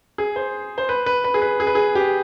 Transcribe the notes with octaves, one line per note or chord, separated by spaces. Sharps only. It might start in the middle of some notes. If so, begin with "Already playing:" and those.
G#4
C5
C5
B4
B4
B4
G#4
B4
G#4
B4
G#4
G4